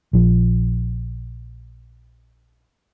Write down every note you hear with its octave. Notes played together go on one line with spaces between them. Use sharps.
A#1 F3